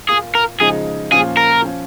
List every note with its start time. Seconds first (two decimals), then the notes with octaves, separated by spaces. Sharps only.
0.09 A#2 A#3 F4 G#4
0.35 A#4
0.60 C#3 F3 G#3 D#4 G#4
1.11 A#2 F3 C#4 F4 G#4
1.37 A#4
1.62 F3 C#4 F4